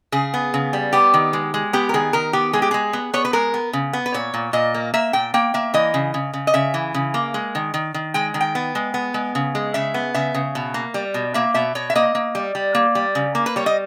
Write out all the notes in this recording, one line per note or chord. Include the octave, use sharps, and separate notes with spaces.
C#3 G#4
B3
C#3
G3
B3 G4
D#3
G#3
G#3
B3 G4
A#4
D#3 G#4
D#3 A#4
B3 G4
G#3 G#4
G4
G#3 G#4
B3
B3 C#5
B4
G#3 A#4
B3
C#3
B3
B4
A#2 C#5
A#2
A#2 D#5
A#3
A#3 E5
A#2 G5
A#3 G5
A#3 E5
E3 D#5
C#3
C#3
C#3
D#5
C#3 E5
E3
C#3
A#3
G#3
D#3
D#3
D#3
G#3 G5
D#3
G5
B3
G#3
B3
G#3
C#3
G#3
C#3 E5
B3
C#3 E5
C#3
B2
A#3
G3
B2
A#3 E5
B2 E5
B2 C#5
E5
A#3 D#5
A#3
G3
G3
A#3
G3
C#3
A#3
B4
G3 C#5
D#5